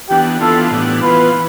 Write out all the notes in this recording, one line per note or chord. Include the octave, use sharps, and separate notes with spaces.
E3 B3 D4 G4
E3 B3 D4 F4 A4
A2 E3 G3 B3 D4
E3 B3 F4 B4
E3